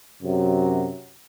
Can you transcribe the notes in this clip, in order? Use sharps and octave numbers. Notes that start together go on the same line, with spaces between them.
F#2 C3 F#3